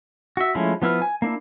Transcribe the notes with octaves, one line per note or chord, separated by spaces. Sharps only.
F#4 E5
F3 G#3 A3 C#4 E4
F3 B3 E4 B4 F6
G#5
A#3 D4 E4